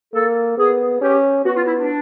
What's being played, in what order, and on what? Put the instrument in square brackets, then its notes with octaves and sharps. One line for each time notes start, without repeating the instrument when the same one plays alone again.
[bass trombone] A#3 [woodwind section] A4
[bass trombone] B3 [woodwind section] G#4
[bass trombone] C#4 [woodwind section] G4
[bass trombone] B3 [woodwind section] F#4
[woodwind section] F4
E4
D4